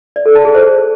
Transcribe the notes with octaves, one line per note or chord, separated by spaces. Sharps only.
D5
A4
A5
G#4
C5